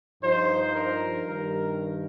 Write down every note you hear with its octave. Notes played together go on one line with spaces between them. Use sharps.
G2 F3 D#4 C5
A#4
G2 D#3 G3 A#4